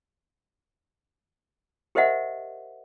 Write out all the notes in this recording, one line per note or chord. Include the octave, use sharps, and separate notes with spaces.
G4 A#4 C5 D#5 E5 F#5